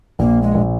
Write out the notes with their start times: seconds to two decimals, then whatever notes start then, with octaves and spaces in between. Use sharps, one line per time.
0.19 A#1 A#3
0.42 G#3
0.54 A#1